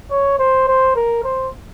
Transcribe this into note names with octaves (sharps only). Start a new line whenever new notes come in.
C#5
C5
C5
A#4
C5